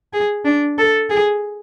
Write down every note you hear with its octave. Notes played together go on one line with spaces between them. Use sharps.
G#4
D4
A4
G#4